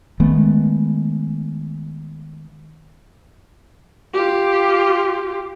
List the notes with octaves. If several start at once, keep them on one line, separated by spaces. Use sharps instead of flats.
D#3 G#3 A3 B3
F4 G4